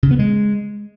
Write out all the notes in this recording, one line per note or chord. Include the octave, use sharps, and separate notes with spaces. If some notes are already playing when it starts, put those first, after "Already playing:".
C#3
B3
G#3